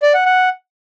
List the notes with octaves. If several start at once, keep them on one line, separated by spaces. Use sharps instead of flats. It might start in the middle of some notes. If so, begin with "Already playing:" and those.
D5
F#5
F#5